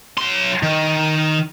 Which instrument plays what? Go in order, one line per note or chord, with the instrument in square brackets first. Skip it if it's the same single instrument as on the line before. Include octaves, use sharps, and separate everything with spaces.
[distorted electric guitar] F#3 C6
D#3